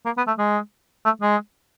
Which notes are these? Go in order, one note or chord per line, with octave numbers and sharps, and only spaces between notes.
A#3
B3
A3
G#3
A3
G#3